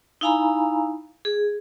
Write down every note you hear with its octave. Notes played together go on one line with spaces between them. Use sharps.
D#4 E4 F5 G#5 A#5 B5
G#4